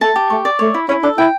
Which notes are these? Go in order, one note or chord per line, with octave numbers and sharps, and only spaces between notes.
A3 A5
G4
A3 C#6
D5
A3 C#5
E4
C#4 E4
D4 A4
E4 G5